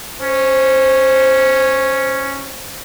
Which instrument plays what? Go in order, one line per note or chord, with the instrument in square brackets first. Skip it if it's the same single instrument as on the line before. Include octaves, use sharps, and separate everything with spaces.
[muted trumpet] C#4 [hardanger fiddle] C5